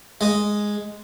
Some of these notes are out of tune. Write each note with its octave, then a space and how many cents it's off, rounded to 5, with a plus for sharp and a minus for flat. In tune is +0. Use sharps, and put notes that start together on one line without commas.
G#3 +0 D#5 +0